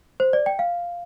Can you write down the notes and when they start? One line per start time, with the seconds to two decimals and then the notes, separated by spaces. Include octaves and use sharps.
0.20 C5
0.33 D5
0.46 G5
0.59 F5